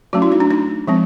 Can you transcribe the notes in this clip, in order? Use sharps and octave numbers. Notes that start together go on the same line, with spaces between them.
F#3 A3 C#4 F#4
E4
D#4
D4
D#4
F3 G#3 C4